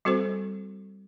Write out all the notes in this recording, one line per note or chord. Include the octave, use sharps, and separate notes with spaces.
G3 C4 F#4 A4 C5